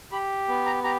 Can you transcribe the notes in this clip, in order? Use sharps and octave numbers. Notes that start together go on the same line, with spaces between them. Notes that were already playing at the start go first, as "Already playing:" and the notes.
G4 B5
B3
A#5
G4 A#5